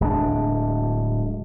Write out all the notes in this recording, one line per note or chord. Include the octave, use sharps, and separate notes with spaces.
D1 G#3 D4